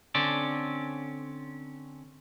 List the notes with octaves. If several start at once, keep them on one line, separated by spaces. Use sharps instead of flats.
D3 C4 C#4 D5